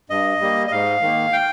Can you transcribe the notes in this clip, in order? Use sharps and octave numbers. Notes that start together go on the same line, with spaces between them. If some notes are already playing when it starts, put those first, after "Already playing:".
G2 D#5
G3 A#3
D#5
G#2 F5
D#3 A#3
G5